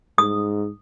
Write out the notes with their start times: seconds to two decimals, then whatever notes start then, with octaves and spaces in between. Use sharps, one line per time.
0.18 G#2 D#6